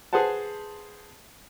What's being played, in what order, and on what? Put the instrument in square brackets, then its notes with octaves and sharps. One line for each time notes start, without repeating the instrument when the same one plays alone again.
[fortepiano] G#4 B4 C5 F#5 A5